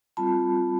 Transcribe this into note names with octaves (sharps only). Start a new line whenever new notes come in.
G3 C4 F4 A5 B5